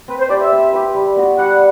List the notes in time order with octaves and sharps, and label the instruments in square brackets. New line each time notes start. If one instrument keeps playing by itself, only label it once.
[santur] C4 [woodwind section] B4
[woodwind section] C5
[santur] G4 B4 [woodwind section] D5
[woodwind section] E5
[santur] C4
G4 B4
G3
B3 F#4
[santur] G3 [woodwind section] F#5